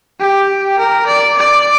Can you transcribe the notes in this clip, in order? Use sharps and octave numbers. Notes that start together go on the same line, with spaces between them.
G4
A#4
D5
D5